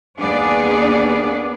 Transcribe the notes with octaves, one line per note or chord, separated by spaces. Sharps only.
D#2 A#3 B3 D4 G#4 D5